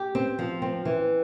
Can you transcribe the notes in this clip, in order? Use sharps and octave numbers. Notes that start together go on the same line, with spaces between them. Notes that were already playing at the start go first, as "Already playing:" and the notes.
Already playing: G4
C4
F3
C4
E3